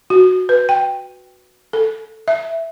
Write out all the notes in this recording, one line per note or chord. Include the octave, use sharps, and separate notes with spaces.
F#4
B4
G5
A4
E5